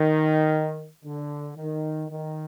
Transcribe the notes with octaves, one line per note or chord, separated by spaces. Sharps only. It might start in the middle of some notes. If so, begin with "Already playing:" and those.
Already playing: D#3
D3
D#3
D#3